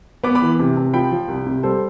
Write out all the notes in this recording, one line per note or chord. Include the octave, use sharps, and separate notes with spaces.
B3 B5 D6
B5 D6
E3
C3
C3
F3 G5 B5
F3
C2
C3
G3 A4 C5